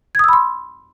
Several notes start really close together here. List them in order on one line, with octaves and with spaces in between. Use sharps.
G#6 D#6 E6 B5 C6